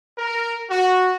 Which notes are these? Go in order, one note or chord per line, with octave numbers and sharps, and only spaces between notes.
A#4
F#4